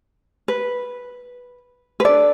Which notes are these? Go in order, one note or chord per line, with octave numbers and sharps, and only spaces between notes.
B4
B4
D4 A4 D5